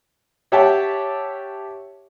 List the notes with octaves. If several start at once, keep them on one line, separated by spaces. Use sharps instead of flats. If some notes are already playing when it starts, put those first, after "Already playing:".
G4 C#5 E5 F#5 G5 A5